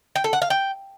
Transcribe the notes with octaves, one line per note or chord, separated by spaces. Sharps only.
G5
A4
F#5
F5
G5